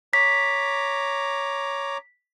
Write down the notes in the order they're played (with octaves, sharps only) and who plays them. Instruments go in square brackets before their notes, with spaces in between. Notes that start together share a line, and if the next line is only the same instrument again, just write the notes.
[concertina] C#5 A#5 D6 [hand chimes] B6